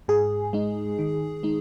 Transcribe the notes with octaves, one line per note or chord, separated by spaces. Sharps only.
G#2 G#4
G#3 D#4
D#3
G#3 D#4